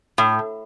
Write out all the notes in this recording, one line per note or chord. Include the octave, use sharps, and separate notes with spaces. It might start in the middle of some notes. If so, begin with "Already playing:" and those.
A2